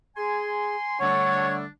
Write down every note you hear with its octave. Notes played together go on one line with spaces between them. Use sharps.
G#4 G#5 C6
D3 G3 A3 D4 C#5 F#5 C#6 G#6